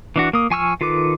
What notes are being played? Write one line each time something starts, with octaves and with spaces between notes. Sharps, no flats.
E3 D4 F#4
A#3 D#6
F3 G#5 C#6 E6 F6
D#3 F4 A4 B4 D6